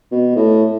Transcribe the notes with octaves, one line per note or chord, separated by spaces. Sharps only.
B2
A2